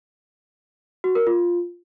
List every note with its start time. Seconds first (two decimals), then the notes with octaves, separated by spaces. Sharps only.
1.04 F#4
1.15 A#4
1.27 F4